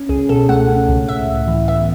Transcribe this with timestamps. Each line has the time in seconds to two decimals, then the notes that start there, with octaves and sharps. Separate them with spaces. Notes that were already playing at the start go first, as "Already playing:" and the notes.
Already playing: C#4
0.09 C#2 G#4
0.29 B2 A4
0.49 A3 F#5
0.68 C#4
0.89 C#2
1.09 A2 E5
1.28 A2
1.48 E3
1.68 B3 E5